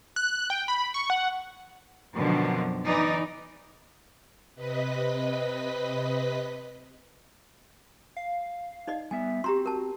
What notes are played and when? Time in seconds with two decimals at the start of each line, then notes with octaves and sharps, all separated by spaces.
0.16 F#6
0.50 G5
0.68 B5
0.94 C#6
1.10 F#5
2.15 F#2 B2 D3 D#3 F3 C4
2.84 E3 D#4 D5
4.55 C3 B4 D#5 B6
8.17 F5
8.87 D#4 D5 D#5
9.11 G3 B3 E5 G#5
9.44 C4 F#4 G4 A#5 C6
9.66 A#4 A5